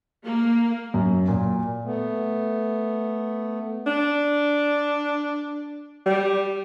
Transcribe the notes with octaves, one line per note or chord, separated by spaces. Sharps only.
A#3
F#2
A#2
A3 B3
D4
G3